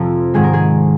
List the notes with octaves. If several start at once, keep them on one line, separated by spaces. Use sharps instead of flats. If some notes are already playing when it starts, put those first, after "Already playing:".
Already playing: F2 C3 F3 C4
G#2 D#3 G#3 G#4
A#4
G#4